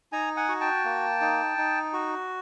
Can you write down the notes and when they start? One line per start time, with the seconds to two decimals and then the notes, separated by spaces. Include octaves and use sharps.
0.12 D#4 G#5 A#5
0.36 F#5 G#5
0.49 F#4
0.61 G5 A5
0.84 A#3
1.21 D#4
1.58 D#4
1.93 F#4